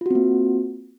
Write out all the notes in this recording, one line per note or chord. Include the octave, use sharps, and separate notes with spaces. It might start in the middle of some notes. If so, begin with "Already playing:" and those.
A#3 C4 F4 F#4